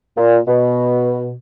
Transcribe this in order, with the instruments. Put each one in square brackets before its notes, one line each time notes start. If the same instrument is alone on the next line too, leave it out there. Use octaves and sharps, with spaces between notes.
[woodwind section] A#2
B2